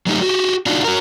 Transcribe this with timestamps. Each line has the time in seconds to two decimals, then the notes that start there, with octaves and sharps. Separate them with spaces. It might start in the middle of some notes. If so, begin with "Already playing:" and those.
0.06 F#3 A3 D#4 G4
0.22 F#4 G4
0.66 D4 D#4 F4 F#4
0.84 F#4 A#4